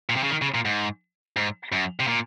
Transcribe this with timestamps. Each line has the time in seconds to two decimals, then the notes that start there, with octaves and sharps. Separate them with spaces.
0.09 A#2
0.16 C3
0.23 C#3
0.30 D#3
0.42 C#3
0.54 A#2
0.65 G#2
1.36 G#2
1.72 F#2
2.00 C3
2.07 A#2